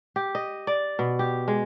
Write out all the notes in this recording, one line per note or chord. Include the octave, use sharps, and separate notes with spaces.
G4
D#5
D5
B2
G4
G#3